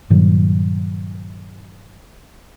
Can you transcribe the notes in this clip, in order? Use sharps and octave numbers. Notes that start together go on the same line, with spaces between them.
G2 A#2 D#3 F#3